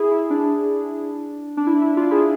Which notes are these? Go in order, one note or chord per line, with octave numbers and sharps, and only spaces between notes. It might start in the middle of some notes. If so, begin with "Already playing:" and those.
Already playing: E4 G#4
E4
D4
D4
E4
E4
D4 F4
E4 G#4